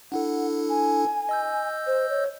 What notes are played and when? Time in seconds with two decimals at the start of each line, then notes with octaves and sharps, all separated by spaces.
0.12 D4 E4 A4 F#5
0.70 G#5
1.29 D#5 E6 G6
1.87 C5
2.10 C#5